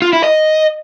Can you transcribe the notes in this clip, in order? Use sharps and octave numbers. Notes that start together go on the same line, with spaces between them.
F4
E4
D#5